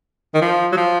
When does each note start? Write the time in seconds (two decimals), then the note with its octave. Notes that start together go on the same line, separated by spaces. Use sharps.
0.34 D#3
0.41 F3
0.72 F#3
0.77 F3